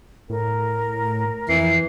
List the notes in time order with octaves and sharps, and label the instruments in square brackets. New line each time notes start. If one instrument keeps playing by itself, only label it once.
[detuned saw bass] A2 [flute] A#4
[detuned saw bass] F2 [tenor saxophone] E3 [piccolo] C7